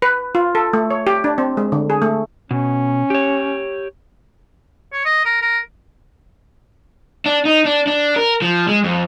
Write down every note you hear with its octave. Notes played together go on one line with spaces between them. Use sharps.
B4
F4
A4
A3
C#5
G4
D4
C4
G#3
D3
G#4
A3
B2 C#4
G4 C#5
C#5
D#5
A#4
A#4
D4
D#4
D4
D4
A#4
F3
G#3
F2